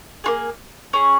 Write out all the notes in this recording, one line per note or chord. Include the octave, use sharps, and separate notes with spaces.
A#3 F4 G#4
C#4 G#4